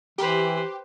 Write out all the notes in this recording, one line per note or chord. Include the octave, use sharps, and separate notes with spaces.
E3 G4 B4 C5